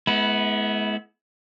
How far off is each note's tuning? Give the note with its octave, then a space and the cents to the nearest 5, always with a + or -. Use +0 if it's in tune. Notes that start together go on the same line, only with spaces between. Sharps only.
G#3 +35 B3 -5 E4 -15